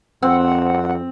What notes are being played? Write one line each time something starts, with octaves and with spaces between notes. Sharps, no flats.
F2 C4 F#5